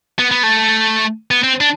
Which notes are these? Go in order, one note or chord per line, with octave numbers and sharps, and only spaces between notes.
B3
B3
A3
B3
C4
D4